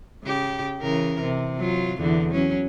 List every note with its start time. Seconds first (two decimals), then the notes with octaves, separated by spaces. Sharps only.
0.24 C#3 G4
0.81 C#3 E3 A#4
1.21 C3
1.57 F#3 F4
1.98 E2 D3 E3
2.31 F#3 C#4